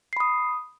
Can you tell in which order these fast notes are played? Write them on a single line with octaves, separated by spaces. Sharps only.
C7 B5 D#6